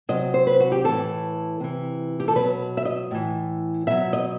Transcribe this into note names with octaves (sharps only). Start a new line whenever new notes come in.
C3 F#3 D#5
C5
B4
F#4
G4
A2 E3 A4
C3 E3
G4
A4
B2 F#3 B4
E5
D#5
A2 E3
B2 F#3 E5
D#5